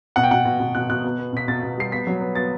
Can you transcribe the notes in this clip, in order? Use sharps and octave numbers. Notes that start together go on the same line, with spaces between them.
B2 F#5
G5
B2 F#5
B2
B2
B2 F#6
B2 F#6
B3
B3
B2 B6
B2 A6
B2
G3 C7
B3 B6
F#3
B3
B3 A6